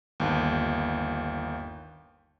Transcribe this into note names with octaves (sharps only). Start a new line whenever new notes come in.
G1 D#2